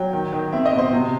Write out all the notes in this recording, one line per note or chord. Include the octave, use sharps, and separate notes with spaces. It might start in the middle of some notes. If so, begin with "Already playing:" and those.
Already playing: F#3 G5
D#3
D#3
C4 E5
D#5
B2
C5
C3